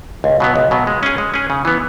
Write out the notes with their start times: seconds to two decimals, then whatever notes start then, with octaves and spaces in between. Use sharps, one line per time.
0.24 C#2
0.40 B2 F#3 B3
0.56 C#2
0.71 B2 F#3 B3
0.87 G#3
1.03 C#4 G#4
1.18 G#3
1.34 C#4 G#4
1.50 C#3
1.65 E3 B3